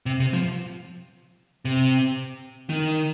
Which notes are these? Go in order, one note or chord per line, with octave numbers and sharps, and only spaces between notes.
C3
C3
F3
C3
D#3